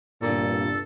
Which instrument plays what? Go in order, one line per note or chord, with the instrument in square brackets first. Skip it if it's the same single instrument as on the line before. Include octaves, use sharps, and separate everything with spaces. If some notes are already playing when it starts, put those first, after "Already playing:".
[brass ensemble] G1 C2 G2 [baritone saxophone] A#2 [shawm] A4